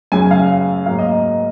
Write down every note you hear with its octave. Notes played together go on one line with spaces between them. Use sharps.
F#2 C#3 F#3 G#5
F5
G#2 F#3 A#3 F5
D#5
D#5